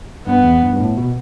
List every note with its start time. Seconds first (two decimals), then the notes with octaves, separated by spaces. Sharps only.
0.26 G2 B3
0.44 E2
0.62 G2
0.73 G2
0.80 A2
0.97 B2